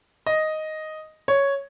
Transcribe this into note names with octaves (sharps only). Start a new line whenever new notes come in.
D#5
C#5